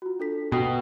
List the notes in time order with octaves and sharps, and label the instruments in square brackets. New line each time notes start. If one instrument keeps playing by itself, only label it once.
[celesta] F4 F#4
D4 A4 B6
[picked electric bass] B2 [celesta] G5 D#6 C7